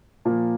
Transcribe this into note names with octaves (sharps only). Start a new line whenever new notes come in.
A#2 F3 A#3